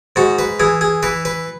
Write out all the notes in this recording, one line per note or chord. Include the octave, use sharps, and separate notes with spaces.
G#2 F#4
B4
E3 G#4
G#4
E3 B4
B4